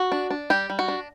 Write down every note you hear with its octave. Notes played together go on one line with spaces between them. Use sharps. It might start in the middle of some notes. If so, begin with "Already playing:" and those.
Already playing: F#4
D4
D4
G3 G4
G3
F#4
D4